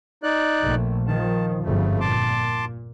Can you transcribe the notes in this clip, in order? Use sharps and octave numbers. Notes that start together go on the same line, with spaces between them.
D#4 D5 F#6
A#1 A3
D#3 F3 A5
G1 F2 G#2 C#3 A3
A#2 A5 C6 D6